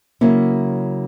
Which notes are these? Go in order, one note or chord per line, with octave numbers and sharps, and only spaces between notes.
C#3 F#3 A#3 C#4 E4